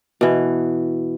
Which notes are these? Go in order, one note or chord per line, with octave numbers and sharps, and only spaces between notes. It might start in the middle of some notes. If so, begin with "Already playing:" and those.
B2 E3